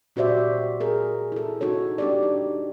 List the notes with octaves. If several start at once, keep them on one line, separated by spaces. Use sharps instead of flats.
A#2 F#4 G4 C5 D5 E5
G#4 A#4
E4 A4
D#4 F#4 A4 C#5
D4 G4 D5
D#4